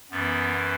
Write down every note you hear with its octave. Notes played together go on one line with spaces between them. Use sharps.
F#2 E3 B3